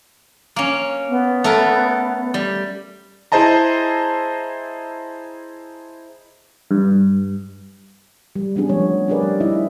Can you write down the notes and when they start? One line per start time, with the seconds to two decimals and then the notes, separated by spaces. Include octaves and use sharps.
0.56 A#3 C#4
1.09 B3
1.44 A3 A4 A#4
2.34 G3
3.32 E4 G#4 C5 D#5 A5 A#5
6.71 G2
8.36 G3
8.56 G3 B3 C#4 D4 G#4
8.69 F3 G#3 A3 B3 C4 C#5
9.08 D4 G4 G#4 A#4 B4 D5
9.23 G3
9.41 D#4 E4 D#5 E5